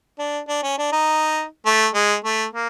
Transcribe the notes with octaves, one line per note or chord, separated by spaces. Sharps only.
D4
D4
C#4
D4
D#4
A3
G#3
A3
A#3